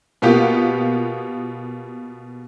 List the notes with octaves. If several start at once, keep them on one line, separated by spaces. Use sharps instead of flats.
B2 A#3 B3 F4 G4